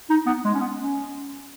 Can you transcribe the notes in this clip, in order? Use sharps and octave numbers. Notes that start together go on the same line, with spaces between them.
D#4
B3
G#3
C#4
B3
C#4